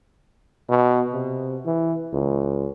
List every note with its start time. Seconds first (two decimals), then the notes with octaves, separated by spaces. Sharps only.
0.69 B2
1.14 C3
1.66 E3
2.13 C#2